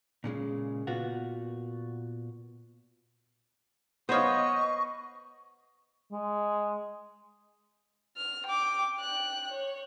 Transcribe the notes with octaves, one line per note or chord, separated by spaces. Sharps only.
A#2 C#3 G#3
A#2 B3 F4 F#4
B3 C5 C#5 D#5 F5 C#6
G#3
F6
G5 D6
G5 F#6
C#5